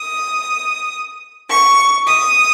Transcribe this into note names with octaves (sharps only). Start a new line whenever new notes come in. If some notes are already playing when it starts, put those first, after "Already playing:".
Already playing: D#6
C#6
D#6